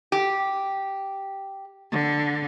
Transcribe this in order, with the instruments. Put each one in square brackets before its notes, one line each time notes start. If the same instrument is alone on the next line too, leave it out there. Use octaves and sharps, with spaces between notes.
[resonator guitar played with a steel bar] G4
[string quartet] D3